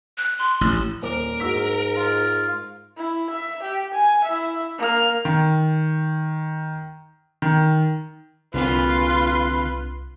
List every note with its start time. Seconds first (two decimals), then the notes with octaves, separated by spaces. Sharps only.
0.17 F#6
0.39 C6
0.61 A1
1.02 D#1 A#4 C5 D6
1.40 G#2 F#4 E6 B6
1.96 F4
2.97 E4
3.30 E5
3.62 G4
3.94 G#5
4.24 E4 E5
4.78 A#3 F6
5.25 D#3
7.42 D#3
8.54 C2 D3 C4 F4 B4 F5 C6